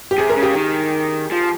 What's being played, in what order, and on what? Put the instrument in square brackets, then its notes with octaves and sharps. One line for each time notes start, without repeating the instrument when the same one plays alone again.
[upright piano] G4
[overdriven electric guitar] C3 [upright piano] G#4
[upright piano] A#4
[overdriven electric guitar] C#3
[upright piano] G4
[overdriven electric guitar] D#3
F3